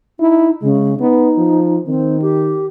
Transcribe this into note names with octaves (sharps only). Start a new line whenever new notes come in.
D#4 E4
C#3 G#3
B3 D#4
F3
D#3 C4
G4